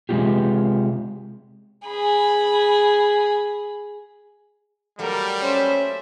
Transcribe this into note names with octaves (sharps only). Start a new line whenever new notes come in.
C3 G#3 B3 C#4 F4 G4
G#4 B5
F#3 G3 A3 A#3 A#4
C#4 C5 E5